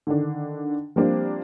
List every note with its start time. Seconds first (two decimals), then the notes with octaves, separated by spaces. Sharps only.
0.07 D3 D#3 D4
0.96 F3 G3 A#3 C4 D4